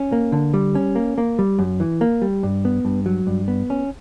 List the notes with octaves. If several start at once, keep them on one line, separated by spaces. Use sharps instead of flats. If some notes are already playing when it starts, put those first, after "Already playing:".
Already playing: C#4
A#3
D3
G3
C#4
A#3
A#3
G3
F#2
E3
A#3
G3
G2
B3
G2
F#3
G2
B3
C#4